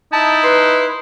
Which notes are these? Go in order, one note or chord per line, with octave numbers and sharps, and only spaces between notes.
D#4 E4 A5
B4 C6